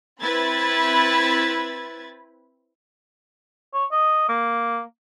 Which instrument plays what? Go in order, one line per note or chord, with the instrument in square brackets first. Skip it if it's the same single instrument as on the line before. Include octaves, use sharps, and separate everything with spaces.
[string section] C4 E4 B4 B5 G#6 A6
[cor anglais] C#5
D#5
A#3